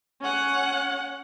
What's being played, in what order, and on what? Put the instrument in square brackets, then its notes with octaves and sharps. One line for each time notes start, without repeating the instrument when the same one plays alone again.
[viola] C#4 F#5